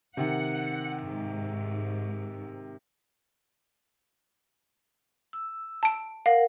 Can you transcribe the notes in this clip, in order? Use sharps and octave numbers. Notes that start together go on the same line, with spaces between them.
C3 D#3 F#5
G#2
E6
A5 D7
A#4 F5 F#5